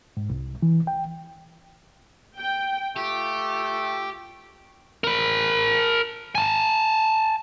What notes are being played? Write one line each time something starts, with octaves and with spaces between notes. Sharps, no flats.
G#2
C2
E3
G5
G5
A3 F4 G4
A#4 B5
G#5 A5